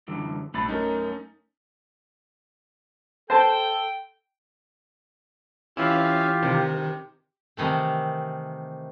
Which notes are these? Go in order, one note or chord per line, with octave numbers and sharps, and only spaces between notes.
F#2 D3 E3
A#1 C3 A3 B5 A6
F#2 A3 C#4 D#4 G#4 A#4
A4 C5 G5 A5
E3 C#4 E4 F4 G4 E5 F5
C3 D#3
C3 D#3 E3 A3